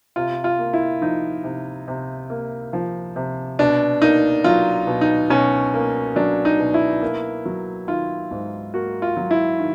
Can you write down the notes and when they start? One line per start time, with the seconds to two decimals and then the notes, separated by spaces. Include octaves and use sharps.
0.16 C3 F4
0.44 F4
0.59 A#3
0.73 E4
1.01 F3 D#4
1.44 C3
1.88 C3
2.30 A#3
2.73 F3
3.16 C3
3.59 B2 D4
4.02 A#3 D#4
4.44 F#3 F4
4.87 B2
5.01 D#4
5.30 B2 C#4
5.74 A#3
6.16 F#3 D4
6.45 D#4
6.59 B2
6.74 E4
7.02 A#3
7.46 F#3
7.88 D#3 F4
8.31 G#2
8.74 A#3 F#4
9.02 F4
9.17 F#3
9.31 E4
9.59 D#3